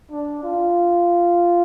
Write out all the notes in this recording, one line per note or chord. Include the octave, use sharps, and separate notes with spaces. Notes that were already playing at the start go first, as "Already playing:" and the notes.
D4
F4